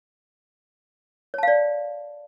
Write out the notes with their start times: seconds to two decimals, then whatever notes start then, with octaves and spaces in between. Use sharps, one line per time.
1.34 C#5
1.38 A5
1.43 F5
1.48 D5